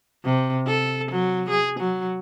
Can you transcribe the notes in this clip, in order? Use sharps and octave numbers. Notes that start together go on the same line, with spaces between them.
C3
A4
F#3
G#4
F#3